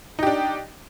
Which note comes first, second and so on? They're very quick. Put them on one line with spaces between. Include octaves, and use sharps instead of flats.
D#4 G4 D4